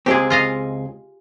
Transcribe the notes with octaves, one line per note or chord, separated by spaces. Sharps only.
C#2 G#3 C4 G4 G#4
F4 D#5 F5